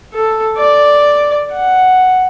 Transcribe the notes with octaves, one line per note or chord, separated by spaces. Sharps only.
A4
D5
F#5